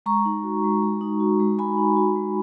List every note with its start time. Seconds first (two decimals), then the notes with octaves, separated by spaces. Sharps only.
0.06 G#3 A#5 C#6
0.25 D#4
0.43 F#4
0.64 G#3
0.83 G#3
1.01 D#4
1.20 F#4
1.40 G#3
1.58 G#3 G#5 B5
1.78 D#4
1.96 F#4
2.16 G#3